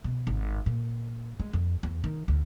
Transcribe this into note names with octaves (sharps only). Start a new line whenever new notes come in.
B2
G#1
A#2
G#3
F2
E2
D#3
D2